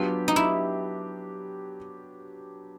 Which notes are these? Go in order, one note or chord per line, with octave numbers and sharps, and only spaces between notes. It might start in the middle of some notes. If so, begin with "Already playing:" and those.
Already playing: F#3 B3 D4 F4 G4
D#4
E4